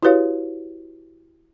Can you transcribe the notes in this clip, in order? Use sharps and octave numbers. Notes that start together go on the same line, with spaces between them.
E4 F#4 G4 B4 C#5 F5